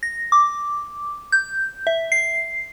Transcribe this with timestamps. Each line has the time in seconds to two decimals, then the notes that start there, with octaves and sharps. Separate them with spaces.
0.03 A#6
0.32 D6
1.32 G6
1.87 E5
2.12 C7